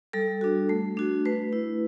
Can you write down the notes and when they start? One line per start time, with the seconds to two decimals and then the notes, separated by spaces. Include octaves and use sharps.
0.13 G3 A4
0.41 D4 F#4
0.69 A3
0.97 D4 F#4
1.25 A3 B4
1.53 E4